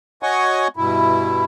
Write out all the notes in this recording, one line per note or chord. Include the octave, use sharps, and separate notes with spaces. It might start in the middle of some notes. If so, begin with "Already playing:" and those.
F#4 C#5 D#5 F#5 G#5 C#6
G2 B2 E4